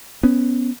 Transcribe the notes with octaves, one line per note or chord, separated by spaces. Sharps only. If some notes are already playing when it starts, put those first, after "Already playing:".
B3 C#4